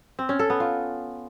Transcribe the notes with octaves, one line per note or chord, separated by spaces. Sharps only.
C4
C#4
A4
B3
F4